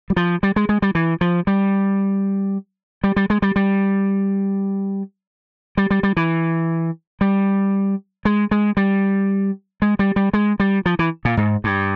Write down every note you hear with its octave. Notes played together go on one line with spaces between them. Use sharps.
G3
F3
G3
G#3
G#3
G3
E3
F3
G3
G3
G3
G#3
G3
G3
G3
G3
G3
E3
G3
G#3
G#3
G3
G#3
G3
G3
G#3
G3
F3
E3
A#2
G#2
G2